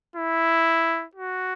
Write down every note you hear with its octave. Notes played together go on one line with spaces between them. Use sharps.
E4
F#4